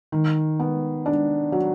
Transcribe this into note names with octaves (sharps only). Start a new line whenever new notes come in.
D#3
B3
D4
F#3